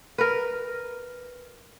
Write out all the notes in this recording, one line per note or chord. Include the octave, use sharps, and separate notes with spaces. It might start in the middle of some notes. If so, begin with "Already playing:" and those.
A#4 B4